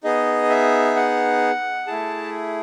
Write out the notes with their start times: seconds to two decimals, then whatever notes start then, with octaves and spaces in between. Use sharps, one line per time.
0.04 B3 D#4 G#4 D#5
0.50 E5
0.96 F#5
1.87 A3 E4 G#4 A5